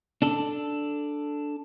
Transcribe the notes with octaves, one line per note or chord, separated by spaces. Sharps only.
D4 A4